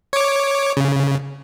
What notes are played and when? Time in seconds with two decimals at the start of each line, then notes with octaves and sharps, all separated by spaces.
0.13 C#5 D6
0.77 C#3